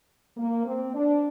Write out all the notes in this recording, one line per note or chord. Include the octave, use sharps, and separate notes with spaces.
A#3
C4
D4